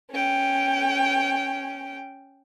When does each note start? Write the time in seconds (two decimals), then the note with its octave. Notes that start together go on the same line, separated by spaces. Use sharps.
0.12 C#4 G5